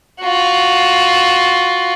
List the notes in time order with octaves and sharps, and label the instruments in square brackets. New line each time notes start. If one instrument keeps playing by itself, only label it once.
[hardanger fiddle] F4 F#4